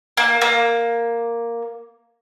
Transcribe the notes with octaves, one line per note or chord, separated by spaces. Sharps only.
A#3
A#3